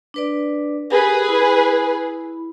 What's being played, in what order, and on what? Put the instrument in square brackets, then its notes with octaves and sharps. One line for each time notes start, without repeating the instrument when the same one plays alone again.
[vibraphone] D4 B4 D5
[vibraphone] G4 A#4 [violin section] G#4 B4
[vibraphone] E4 B5